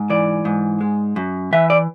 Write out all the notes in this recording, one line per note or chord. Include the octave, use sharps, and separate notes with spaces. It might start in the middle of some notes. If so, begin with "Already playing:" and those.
Already playing: G#2
E3 D5
G#2
G#3
F#2
E3 E5
D5